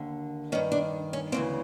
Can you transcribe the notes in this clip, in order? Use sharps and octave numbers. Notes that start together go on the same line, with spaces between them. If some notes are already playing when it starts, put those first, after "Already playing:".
Already playing: D#2 D3
G2 D#3 C#4
D4
C#4
D2 C#3 E3 C4